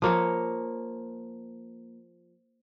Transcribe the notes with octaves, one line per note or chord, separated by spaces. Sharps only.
F3 A#3 C#5